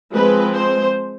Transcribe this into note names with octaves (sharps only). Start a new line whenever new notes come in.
F3 G#3 C4 B4
C5